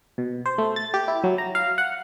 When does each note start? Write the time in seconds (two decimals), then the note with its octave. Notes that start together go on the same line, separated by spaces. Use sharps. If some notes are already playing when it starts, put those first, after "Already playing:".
0.18 B2
0.46 C5
0.58 A3
0.76 A6
0.94 G4
1.08 E4
1.24 F#3
1.38 A#5
1.55 F5
1.78 F#5